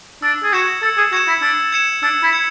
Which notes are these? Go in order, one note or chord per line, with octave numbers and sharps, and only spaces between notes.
D4 E6
G#4
F#4 G#6 C#7 E7
A4 E6
G#4
F#4 G#6 C#7 E7
E4
D4 E6
G#6 C#7 E7
D4 E6
E4
G#6 C#7